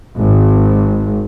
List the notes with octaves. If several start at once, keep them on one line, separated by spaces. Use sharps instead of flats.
G#1